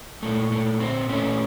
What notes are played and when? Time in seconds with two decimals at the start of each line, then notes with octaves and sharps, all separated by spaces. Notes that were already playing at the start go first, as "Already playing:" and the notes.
0.23 A#2 A3
0.52 A3
0.80 C4
1.09 A#2 A3 C#4